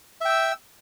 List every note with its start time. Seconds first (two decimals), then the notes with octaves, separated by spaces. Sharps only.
0.21 E5
0.25 G5
0.30 E6